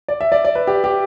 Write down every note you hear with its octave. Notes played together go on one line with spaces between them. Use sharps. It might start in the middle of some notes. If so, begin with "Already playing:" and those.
D5
E5
D5
D5
B4
G4
G4